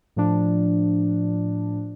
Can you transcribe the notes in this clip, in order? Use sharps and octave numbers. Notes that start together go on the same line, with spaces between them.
A2 F3 D4